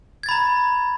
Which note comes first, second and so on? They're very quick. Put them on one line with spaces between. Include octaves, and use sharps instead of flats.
G#6 A6 B5 A#5